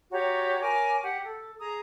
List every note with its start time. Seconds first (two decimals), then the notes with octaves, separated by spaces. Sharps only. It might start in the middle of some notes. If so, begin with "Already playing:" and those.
0.11 F#4 G4 C#5 A#5
0.61 A#4 C#5 G#5 D6
1.03 G4 F#5
1.23 A4
1.60 G#4 A#5 D#6